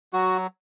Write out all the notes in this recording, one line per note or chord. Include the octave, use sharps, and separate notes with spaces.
F#3 F#4